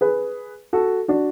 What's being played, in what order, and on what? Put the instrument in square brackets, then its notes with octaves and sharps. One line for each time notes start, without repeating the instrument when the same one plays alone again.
[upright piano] G#4 B4
F#4 A4
D4 F#4